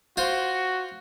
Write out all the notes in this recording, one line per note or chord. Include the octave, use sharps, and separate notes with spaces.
F4 F#4 C5